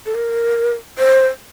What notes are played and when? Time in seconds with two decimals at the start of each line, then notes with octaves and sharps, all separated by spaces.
0.06 A4
0.15 A#4
0.98 C5